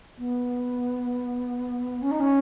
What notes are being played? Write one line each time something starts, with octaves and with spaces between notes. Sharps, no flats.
B3
C#4
D#4
C#4